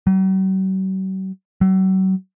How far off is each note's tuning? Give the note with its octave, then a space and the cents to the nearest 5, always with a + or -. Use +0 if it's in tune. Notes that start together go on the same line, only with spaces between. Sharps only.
F#3 +45
F#3 +40